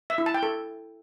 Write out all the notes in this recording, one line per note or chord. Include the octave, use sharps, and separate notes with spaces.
E5
E4
A5
G5
A4